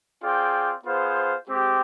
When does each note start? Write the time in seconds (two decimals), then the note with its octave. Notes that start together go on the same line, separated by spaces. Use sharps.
0.23 C4 F4 G#4 D5 G5
0.85 B3 F4 G#4 C5
1.49 G#3 C4 G4